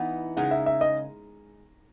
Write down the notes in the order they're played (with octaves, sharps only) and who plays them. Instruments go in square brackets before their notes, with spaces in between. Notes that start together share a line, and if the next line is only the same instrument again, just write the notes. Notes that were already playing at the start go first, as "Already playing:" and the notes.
Already playing: [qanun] E3 B3 D#4 [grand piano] F#5
[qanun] C#3 G#3 D#4 A#4 [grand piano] F#5
[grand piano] E5
E5
D#5